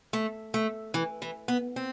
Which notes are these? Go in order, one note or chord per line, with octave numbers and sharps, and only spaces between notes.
A3
A3
E3
E3
B3
C4